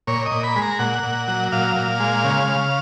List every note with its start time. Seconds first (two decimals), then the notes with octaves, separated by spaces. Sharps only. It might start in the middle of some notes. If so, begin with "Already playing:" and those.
0.07 A#2 C#5
0.26 D#5
0.31 A#2
0.44 B5
0.56 G#3
0.62 A#5
0.79 A#2 F#5
1.03 A#2
1.28 F#3
1.52 A#2 F5
1.76 A#2
2.00 G#3
2.24 C#3
2.48 C#3